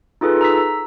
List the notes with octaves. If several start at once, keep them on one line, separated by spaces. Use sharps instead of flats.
D#4 F4 G#4 A4 B4
A#5 E6 B6